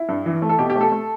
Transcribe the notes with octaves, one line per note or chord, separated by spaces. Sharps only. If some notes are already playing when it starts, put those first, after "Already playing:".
Already playing: E4
G2
E3
A3
A4
B2 G4
G4
A3
A4
A3